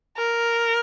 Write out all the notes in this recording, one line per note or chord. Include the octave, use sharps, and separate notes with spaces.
A#4